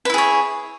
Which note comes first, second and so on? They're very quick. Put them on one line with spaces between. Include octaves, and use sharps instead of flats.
B4 E4 G#4 C#5